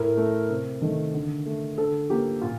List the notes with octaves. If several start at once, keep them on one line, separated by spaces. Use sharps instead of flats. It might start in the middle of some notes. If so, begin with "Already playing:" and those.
Already playing: A2 A#4
A3
C3
D#3 A3
D3
A3
D3 A4
F3 A#3 G4
A#2 F4